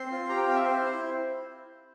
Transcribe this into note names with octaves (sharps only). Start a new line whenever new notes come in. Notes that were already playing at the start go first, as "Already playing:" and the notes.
Already playing: C4 C6
F4
G4 A#5
G5
C4 F5
E5
C4 C5
E4